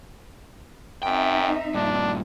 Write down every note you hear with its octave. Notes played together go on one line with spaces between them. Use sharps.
F#2 C4 D#4 E5 G5
G2 A#2 D4